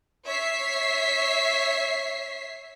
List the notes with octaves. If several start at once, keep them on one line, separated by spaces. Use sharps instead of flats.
C#5 E5 B6 C7